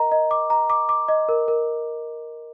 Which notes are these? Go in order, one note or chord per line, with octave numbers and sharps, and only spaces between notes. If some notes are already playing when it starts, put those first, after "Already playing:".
Already playing: A#4 D#5 A#5
D#5
D6
A#5
D6
D6
D#5
A#4
A#4